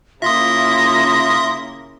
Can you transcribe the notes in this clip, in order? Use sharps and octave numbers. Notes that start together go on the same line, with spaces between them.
C#3 A#3 E4 F4 E5 C6 D#6 A#6